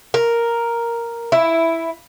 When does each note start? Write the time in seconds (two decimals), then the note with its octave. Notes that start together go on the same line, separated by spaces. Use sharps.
0.14 A#4
1.32 E4